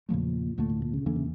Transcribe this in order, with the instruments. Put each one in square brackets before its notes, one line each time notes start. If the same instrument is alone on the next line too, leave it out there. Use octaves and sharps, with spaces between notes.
[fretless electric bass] E2 C#3 F3 A3 [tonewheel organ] A#2
[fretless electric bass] D2 D3 A3 [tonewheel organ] A#2
[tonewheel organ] A2
A#2
C#3
[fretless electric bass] E2 E3 A#3 [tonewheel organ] D3
[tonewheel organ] C#3